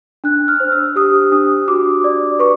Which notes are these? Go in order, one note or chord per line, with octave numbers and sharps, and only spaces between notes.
D4 F#6
F6
C5
E6
G4 D#6
D4 D#6
F#4 D6
D5
B4 C#6